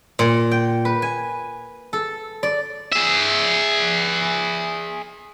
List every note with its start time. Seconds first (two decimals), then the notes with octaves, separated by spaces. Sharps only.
0.19 A#2
0.51 G5
0.85 B4
1.02 G#5
1.93 A4
2.43 D5
2.93 G#4 E5